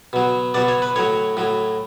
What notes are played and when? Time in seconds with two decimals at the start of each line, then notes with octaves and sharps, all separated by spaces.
0.13 B2 F#3
0.54 B2 F#3 D5
0.68 C#5
0.82 B4
0.96 A2 F#3 C#5
1.37 A2 F#3